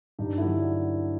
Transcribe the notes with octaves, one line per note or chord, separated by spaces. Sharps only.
G2 D#4
D3 F#3 E4